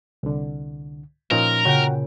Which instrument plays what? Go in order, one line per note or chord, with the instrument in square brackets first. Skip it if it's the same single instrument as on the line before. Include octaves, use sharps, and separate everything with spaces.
[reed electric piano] C2 D3
[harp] A#2 [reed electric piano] F3 C#4 D#4 [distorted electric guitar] A#4
[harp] C#3 G5 [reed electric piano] F#4 F#5